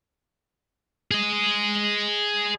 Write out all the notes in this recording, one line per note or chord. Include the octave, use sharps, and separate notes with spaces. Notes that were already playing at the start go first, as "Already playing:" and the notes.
G#4 D#5